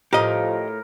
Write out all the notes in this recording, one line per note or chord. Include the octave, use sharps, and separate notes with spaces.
A2 F3 F4 G4 A#4 D#5